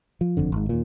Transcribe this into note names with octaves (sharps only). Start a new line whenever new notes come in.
F3
F#1 F2 D3
G#1 G#2
D#2 A#2